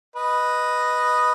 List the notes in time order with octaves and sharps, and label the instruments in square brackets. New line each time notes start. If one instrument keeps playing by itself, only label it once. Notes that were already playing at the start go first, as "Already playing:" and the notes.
[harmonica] B4 D#5